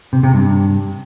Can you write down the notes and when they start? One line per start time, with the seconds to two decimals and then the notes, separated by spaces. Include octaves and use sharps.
0.13 C3
0.23 C3
0.34 G2